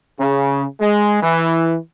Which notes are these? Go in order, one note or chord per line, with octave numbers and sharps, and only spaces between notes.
C#3
G#3
E3